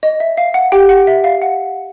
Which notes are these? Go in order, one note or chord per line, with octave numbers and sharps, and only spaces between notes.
D#5
E5
F5
F#5
G4 G5
F#5
E5
F5
F#5